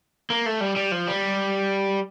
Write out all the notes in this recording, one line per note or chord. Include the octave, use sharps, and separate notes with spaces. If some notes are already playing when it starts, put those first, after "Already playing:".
A#3
A3
G3
G3
F3
G3